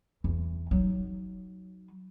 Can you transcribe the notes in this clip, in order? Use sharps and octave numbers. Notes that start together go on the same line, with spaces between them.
E2
F#3 D#4